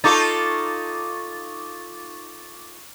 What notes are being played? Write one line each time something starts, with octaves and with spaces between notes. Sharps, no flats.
D#4 F4 A4 C#6 D6 A6